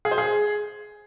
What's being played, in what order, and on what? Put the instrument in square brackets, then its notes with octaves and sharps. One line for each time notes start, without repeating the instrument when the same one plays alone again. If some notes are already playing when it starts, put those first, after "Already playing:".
[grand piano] G#4
C5
G#4